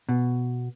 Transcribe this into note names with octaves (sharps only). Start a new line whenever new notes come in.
B2